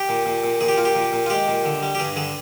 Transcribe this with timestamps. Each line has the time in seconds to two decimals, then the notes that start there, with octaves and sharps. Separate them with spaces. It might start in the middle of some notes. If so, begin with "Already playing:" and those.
Already playing: G4
0.09 A#2
0.26 A#2
0.44 A#2
0.61 A#2 G#4
0.68 G4
0.77 A#2 F4
0.85 G4
0.96 A#2
1.13 A#2
1.26 F4
1.30 G#3 G4
1.48 A#2
1.65 D3
1.83 G3
1.95 G4
1.99 G2 G#4
2.16 D3 G#4